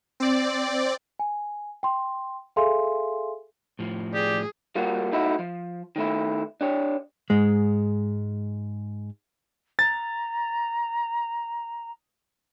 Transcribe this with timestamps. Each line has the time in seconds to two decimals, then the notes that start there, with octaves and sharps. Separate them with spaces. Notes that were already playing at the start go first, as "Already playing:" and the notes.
0.20 C4 D5
1.19 G#5
1.83 G5 C6
2.56 G#4 A4 E5 F5 G#5 C6
3.79 A2 F3
4.14 G4 G#4 D5
4.75 G3 A#3 F4 F#4
5.12 A3 D#4 E4 F#4
5.39 F3
5.96 D#3 A3 E4
6.61 D4 G4 C#5
7.30 G#2 G#3
9.79 A#5 A6